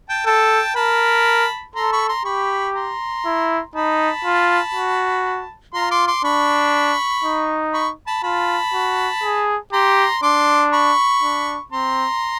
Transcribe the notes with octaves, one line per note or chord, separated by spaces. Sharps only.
G5 A5
A4 G5 A5
A#4 A5 B5
A4 A#5 C6
B5 C#6
A#5 C6
G4 B5 C#6
A#5 C6
E4
D#4 A5 B5
F4
F#4
F4 A#5 C6
C6 D6
C6 D6
D4 B5 C#6
D#4
B5 C#6
A5 B5
F4 A5 B5
F#4
G#4
G4 A#5 C6
D4 C6 D6
B5 C#6
D4
C4 A#5 C6